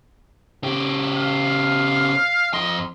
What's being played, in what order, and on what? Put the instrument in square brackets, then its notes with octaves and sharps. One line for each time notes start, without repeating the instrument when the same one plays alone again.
[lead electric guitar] C#3 G4
[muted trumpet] F5
[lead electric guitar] F2 C6 [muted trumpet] D#5